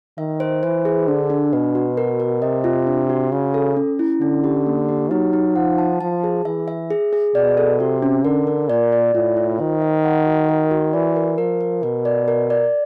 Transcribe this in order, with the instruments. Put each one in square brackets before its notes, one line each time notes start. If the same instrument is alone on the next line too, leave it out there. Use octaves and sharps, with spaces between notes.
[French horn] D#3 [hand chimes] E5
[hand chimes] C5
[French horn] E3 [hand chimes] C5
[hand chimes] G#4
[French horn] D3 [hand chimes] D4
[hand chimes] D4
[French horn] B2 [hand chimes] B4
[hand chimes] F#4
A#4
A#4
[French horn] C3 [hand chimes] D#5
[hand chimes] F4
D4
F#4
[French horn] C#3 [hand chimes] F#4
[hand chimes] A4
C#4
E4
[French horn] D3 [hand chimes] C#4
[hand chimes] G4
A#3
G4
[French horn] F#3 [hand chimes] D#4
[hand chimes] D#4
[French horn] F3 [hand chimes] F#5
[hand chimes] A5
[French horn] F3 [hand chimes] A5
[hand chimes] G#4
[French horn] E3 [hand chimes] E5
[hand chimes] E5
G#4
G#4
[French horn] B2 [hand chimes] D5
[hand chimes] A4
[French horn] C3 [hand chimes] F#4
[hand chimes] C#4
[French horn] D3 [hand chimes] A#4
[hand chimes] A#4
[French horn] A#2 [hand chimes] D5
[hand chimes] D5
[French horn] A2 [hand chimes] F4
[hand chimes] F4
[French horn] D#3 [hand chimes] C5
[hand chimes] E5
F#5
F#4
A#4
F#4
[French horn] E3 [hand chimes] D5
[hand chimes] A#4
[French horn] F3 [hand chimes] A#4
[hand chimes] A#4
[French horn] B2 [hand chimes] A#4
[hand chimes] D5
A#4
D5